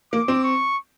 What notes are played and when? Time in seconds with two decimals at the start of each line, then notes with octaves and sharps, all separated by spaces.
0.13 A#3 D6
0.28 C4
0.44 C#6